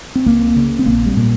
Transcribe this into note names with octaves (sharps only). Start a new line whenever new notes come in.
C4
C#2 A#3
C#3
C4
A#1 A#3
G3
A#2